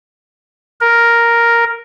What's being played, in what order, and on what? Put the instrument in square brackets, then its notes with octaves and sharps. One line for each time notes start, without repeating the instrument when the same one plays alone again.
[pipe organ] A#4